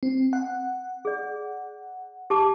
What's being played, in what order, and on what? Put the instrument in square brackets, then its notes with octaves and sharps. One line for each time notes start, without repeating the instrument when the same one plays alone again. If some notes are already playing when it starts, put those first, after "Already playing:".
[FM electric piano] C4
F#5
[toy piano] G#4 D5
G4 A5 D6